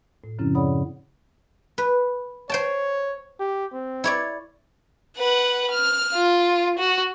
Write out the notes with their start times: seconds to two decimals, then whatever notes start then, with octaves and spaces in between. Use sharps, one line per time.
0.24 A2
0.39 F#2 C#3 F3 C4 C#4 E4
0.55 G#4 C#5 D5 F#5 B5 D#6
1.78 B4
2.50 C5 C#5 G5 A5
3.40 G4
3.73 C4
4.04 E4 C#5 D5
5.17 B4 F#5
5.71 F6
6.14 F4
6.79 F#4